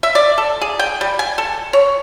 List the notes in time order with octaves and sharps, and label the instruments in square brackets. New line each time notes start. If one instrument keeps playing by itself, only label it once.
[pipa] E5
D5
A4
G#4
G5
G3
G#5
A4
C#5